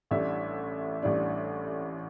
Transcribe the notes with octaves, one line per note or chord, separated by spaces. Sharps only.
A1 A2 G3 D4 E5
A1 A2 G3 D4